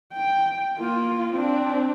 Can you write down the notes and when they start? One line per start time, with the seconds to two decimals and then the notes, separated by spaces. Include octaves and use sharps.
0.13 G5
0.78 A#3 F4
1.33 C4 D4